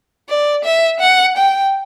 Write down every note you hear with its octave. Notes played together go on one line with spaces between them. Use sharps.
D5
E5
F#5
G5